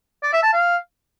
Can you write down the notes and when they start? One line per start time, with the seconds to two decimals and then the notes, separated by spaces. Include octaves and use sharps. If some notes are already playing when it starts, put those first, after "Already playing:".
0.23 D5
0.33 E5
0.43 A5
0.53 F5